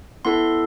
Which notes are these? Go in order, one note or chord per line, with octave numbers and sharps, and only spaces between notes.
B3 E4 A4 C6